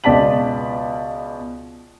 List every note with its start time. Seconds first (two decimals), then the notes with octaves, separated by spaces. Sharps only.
0.04 C#2 B2 D5 A5 B6 F#7